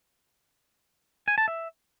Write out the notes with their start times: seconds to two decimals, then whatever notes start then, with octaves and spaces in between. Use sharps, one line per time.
1.28 G#5
1.38 A5
1.48 E5